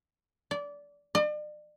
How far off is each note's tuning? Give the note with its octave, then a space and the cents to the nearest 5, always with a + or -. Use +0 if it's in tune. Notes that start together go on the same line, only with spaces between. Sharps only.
D5 -20
D5 +40